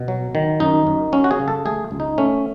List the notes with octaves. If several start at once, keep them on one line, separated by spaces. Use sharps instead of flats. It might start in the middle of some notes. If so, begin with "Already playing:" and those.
Already playing: B2
F#3
D#3
F#2 D#4
F#2
F#3 C#4
F#4
G#4
C#3
A4
A3 G#4
C#2
D#4
A3 C#4